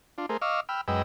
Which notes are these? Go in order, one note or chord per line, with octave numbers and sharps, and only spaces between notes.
D4 F4
A3 G#4 A#4 C5
D#5 F5 C#6 D6 E6 F6
G5 B5 E6 F6
F#2 G#3 B4 D#5 G5 E6